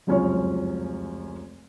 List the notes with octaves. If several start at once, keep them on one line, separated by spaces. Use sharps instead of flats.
F1 C#2 F#2 C#4 F4 C#5